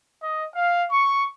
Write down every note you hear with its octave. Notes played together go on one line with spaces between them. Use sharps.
D#5
F5
C#6